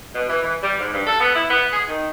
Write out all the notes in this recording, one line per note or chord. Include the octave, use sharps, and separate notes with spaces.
B2
E3
E3
G3
G#2
G2
A4
B3
E4
B3
G#4
D#3